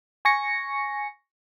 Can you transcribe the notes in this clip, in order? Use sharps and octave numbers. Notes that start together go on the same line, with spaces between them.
G#5 C#6 A#6 C#7